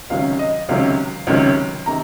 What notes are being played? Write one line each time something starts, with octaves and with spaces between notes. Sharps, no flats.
C#2 C3 D#3 F#3 C#4 F5
D#5
C#2 C3 D#3 F#3 C#4 F5
C#2 C3 D#3 F#3 C#4
C3 D#3 A#5